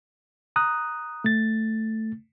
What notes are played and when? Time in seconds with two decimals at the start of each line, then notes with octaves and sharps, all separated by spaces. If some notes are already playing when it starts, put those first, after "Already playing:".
0.56 A#5 D#6 F#6
1.24 A3 A6